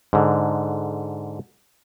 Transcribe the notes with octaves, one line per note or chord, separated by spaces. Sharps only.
G#2 D3